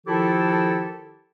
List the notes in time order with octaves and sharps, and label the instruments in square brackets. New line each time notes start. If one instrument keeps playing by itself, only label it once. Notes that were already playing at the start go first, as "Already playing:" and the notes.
[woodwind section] D#3 F3 E4 F4 G4 A4